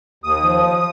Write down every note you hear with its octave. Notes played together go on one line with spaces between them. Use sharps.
D#2 D#6
F3